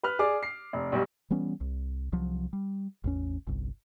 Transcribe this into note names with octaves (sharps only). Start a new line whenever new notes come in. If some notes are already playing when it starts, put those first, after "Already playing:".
B4 F6
G#4 D5 D6
C7
F1
B1 B2 G3
E3 G3 B3 C#4
C2
C2 F3 F#3
G3
A1 E2 C#4
G1 C2